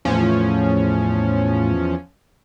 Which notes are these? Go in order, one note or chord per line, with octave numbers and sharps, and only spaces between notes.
E2 A2 F3 C#4